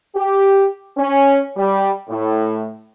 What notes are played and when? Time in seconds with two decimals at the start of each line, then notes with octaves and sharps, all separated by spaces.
0.16 G4
0.97 C#4
1.56 G3
2.09 A2